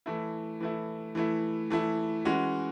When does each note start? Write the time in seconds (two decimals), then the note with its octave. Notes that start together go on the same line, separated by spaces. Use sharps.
0.06 E3 A3 E4
0.60 E3 A3 E4
1.15 E3 A3 E4
1.70 E3 A3 E4
2.25 E3 G#3 C#4 F#4